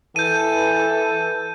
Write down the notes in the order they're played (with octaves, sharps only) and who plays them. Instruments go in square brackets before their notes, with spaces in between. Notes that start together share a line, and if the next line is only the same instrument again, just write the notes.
[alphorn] E3 [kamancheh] A4 [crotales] G6 D#7